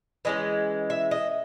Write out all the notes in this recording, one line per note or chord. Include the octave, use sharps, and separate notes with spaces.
E3 G#3 C#4 D#5
E5
D#5